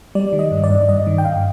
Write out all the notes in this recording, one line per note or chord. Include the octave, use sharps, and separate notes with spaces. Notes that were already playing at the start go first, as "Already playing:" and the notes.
G3 D5
D#3
D#5
G2
D5
G2
G2 D#5
D#3
G5
G2 F5